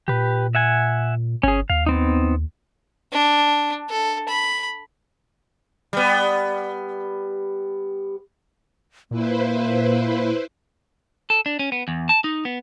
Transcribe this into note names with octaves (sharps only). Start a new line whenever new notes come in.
A#2 G4 B4
E5 F#5 G#5
G1 C#4 G#4
D#2 F5
B3 C4 D#4
D4
A4
B5
G3 B3
A#2 A#3 E4 B4 C5
A4
D4
C#4
B3
E2
A5
D#4
B3